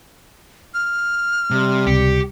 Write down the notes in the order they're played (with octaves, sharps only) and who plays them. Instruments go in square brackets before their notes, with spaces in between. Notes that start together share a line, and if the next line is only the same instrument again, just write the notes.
[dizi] F6
[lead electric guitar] C3 [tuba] G3
[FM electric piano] C#2 C3 C#7 [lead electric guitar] G4